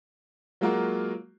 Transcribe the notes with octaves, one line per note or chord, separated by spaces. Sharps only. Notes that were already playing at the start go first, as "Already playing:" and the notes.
F#3 G#3 A#3 F4 F#4 A#4